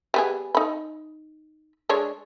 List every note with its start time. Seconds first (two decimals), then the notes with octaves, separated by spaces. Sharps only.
0.14 G3 B3 G#4
0.55 D#4 B5
1.89 G#3 D4 C#5